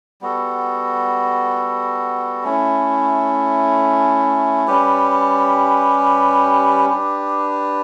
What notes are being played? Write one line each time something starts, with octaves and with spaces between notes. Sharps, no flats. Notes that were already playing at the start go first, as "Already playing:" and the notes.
G3 B3 F#4 A4
A3 C#4 E4
G3 C#4 G4 B4
D4 G4 B4